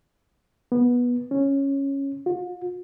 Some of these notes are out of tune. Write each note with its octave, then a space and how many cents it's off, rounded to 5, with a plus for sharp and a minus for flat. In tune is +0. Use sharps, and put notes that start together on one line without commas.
B3 -15
C#4 -5
F4 +45